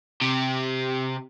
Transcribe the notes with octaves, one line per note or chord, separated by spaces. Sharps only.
C3 G4